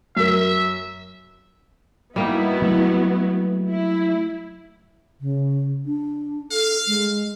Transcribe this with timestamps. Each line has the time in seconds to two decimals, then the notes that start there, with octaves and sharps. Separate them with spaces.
0.17 F#2 A#4 E5
2.16 G3 A#3 B3 D#4 E4 F#4
2.62 F#3 A3
3.70 E4
5.21 C#3
5.86 D4
6.51 A4 F5
6.87 G#3